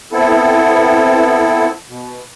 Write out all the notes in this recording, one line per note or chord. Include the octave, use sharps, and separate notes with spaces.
B3 C4 E4 A4
B2